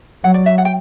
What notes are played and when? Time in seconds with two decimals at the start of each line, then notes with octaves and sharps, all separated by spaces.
0.24 F#3 F#5
0.34 D5
0.46 E5
0.58 F#5
0.65 G5